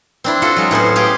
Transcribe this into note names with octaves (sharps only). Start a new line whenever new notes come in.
C4 D4 E4
F4 F#4 A4
F#3 G#3 F5
A2 B3 C#4 C5
G4 G#4 F5 G5